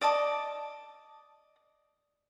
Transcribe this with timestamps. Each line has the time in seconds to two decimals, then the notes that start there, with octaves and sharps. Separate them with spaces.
0.01 D5 D#5 A5 D6